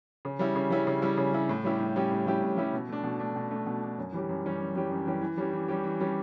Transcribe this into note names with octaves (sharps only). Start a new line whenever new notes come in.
C#3
G3 C#4 E4
C#3
G3 C#4 E4
C#3
G3 C#4 E4
C#3
G3 C#4 E4
A2
G3 C#4 E4 G4
A2
G3 C#4 E4 G4
A2
G3 C#4 E4 G4
A2
G3 C#4 E4 G4
B2
A3 D4
B2
A3 D4
B2
A3 D4
B2
A3 D4
F#2
E3 G3 C#4 G4
F#2
E3 G3 C#4 G4
F#2
E3 G3 C#4 G4
F#2
E3 G3 C#4 G4
E3
G3 C#4 G4
E3
G3 C#4 G4
E3
G3 C#4 G4